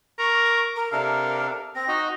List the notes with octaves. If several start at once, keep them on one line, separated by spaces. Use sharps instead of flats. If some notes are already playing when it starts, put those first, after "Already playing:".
A#4 C#6
D6
A#4
C3 D4 A4 A#4 F5
C4 A#6
D#4 F#4 D#5